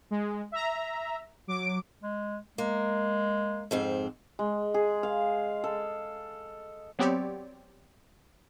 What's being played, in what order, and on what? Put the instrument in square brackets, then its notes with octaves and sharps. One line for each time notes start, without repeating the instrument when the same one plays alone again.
[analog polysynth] G#3
E5 A#5
F#3 D6 D7
[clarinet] G#3
[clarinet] G#3 [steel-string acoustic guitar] A#3
[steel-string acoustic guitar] F2 G#2 C4
[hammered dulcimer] G#3
G#4
F5
A4
[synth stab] F#3 B3 C4 G4 C#5 D5